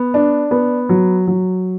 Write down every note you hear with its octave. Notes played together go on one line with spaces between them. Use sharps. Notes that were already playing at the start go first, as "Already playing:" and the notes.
Already playing: B3
D4
B3
F#3
F#3